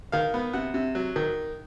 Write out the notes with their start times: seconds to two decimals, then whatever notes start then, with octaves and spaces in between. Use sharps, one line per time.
0.12 D#3 F5
0.34 B3
0.53 C3 F#5
0.74 C3
0.95 F#3
1.16 D#3